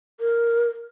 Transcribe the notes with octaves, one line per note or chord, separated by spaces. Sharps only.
A#4